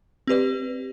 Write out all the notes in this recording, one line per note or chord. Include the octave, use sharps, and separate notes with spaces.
C4 G4 B4 D5